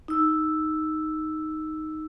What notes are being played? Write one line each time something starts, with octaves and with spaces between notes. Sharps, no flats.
D#4 E6